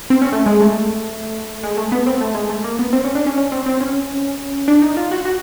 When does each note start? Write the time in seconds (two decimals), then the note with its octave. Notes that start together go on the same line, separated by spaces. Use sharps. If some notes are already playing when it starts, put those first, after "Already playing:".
0.10 C4
0.22 C#4
0.32 A3
0.46 G#3
0.61 A3
1.63 G#3
1.77 A3
1.92 B3
2.07 C4
2.21 A3
2.35 G#3
2.50 A3
2.64 A#3
2.79 B3
2.93 C4
3.04 C#4
3.15 D4
3.26 C#4
3.37 C#4
3.52 C4
3.66 C4
3.81 C#4
4.68 D4
4.82 D#4
4.97 F4
5.11 F#4
5.25 F#4